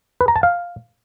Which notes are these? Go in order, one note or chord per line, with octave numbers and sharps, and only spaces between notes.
B4
A#5
A5
F5